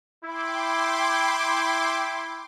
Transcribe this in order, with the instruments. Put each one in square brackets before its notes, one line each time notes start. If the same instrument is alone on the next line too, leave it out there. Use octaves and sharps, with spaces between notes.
[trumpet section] E4 [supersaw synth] G5 C6 D6